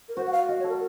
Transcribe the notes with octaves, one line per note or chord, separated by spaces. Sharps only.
A#4
F#4 C5
F#5
F5
F#4 D#5
C#5
A4
A#4